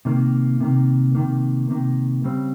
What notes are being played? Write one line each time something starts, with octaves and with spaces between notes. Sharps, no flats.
C3 D#3 A#3
C3 D#3 A#3
C3 D#3 A#3
C3 D#3 A#3
C#3 G3 C4